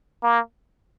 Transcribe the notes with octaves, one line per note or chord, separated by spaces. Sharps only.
A#3